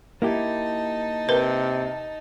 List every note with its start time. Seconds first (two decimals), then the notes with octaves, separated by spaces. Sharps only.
0.22 A#3 D#4 E4 G4 A5
1.29 C3 A#4 B4